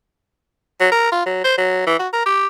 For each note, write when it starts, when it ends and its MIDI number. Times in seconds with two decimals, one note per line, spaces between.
0.80 0.90 54
0.92 1.10 70
1.12 1.23 65
1.26 1.44 54
1.44 1.55 72
1.58 1.86 54
1.86 1.95 52
1.99 2.08 66
2.13 2.23 70
2.26 2.47 67